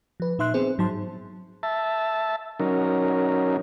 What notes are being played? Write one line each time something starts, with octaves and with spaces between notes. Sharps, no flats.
F3 B4
A#2 D#4 E5 C6 F#6
B3 C4 G#4 C5
G#2 F#3 D#4 A5 C6
E5 A5
F#3 C#4 D#4 A#4